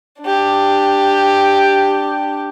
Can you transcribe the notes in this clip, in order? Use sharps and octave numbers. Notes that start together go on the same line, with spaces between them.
D4 G4